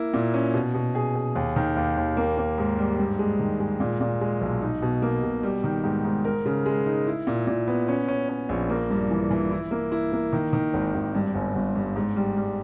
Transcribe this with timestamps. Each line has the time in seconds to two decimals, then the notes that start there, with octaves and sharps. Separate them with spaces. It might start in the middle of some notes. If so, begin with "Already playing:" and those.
Already playing: A#3 E4
0.14 A#2
0.34 C#4
0.54 B2
0.74 B2
0.95 G#4
1.15 G#4
1.35 D#2
1.56 D#3
1.76 D#2
1.97 D#2
2.17 A#3
2.38 A#3
2.58 G#2
2.78 G3
2.99 G2
3.19 G#3
3.40 D#3
3.60 G#3
3.80 A#2
4.00 A#2
4.21 G#3
4.41 B1
4.62 D#4
4.82 B2
5.02 A#3
5.23 B2
5.43 G3
5.64 D#3
5.84 G#2
6.05 G#2
6.25 A#4
6.45 C#3
6.66 G#3
6.86 D#4
7.07 E4
7.27 A#2
7.47 A#2
7.67 B3
7.88 C#4
8.08 C#4
8.29 C#4
8.49 A#1
8.70 A#3
8.90 G2
9.11 E3
9.31 E3
9.51 E4
9.71 A#3
9.92 E4
10.12 A#3
10.33 D#3
10.53 D#3
10.74 G#1
10.94 G#1
11.14 G2
11.35 G1
11.55 G1
11.75 G2
11.96 G#2
12.16 G3
12.37 G3